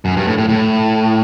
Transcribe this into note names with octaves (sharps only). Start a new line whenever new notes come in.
F#2
G2
A2
A2
A2